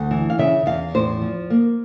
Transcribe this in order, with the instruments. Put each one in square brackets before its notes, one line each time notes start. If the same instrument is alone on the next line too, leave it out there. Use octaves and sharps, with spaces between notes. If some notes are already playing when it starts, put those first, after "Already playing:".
Already playing: [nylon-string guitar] D2 F#5
E3
F5
C#3 E5
E2 F5
A2 C5
F3
A#3